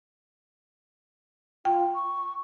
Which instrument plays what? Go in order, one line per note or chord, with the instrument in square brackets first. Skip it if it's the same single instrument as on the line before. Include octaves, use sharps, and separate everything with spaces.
[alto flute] F4 [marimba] G5
[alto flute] C#6